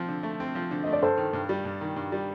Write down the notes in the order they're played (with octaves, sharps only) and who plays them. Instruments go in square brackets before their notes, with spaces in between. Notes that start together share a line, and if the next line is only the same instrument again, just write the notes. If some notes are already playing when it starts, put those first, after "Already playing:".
Already playing: [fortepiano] F3 C4
D3
A3
C4
F3
D3
[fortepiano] A3 [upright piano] D#5
[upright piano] D5
[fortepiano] G2 [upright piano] A4 C5
[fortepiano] D#3
G2
G3
G2
D#3
G2
G3